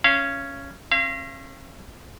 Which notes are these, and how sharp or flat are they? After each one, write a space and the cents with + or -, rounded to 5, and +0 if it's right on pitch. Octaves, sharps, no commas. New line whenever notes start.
C#4 +0 F5 -30
C#4 -40 F5 -35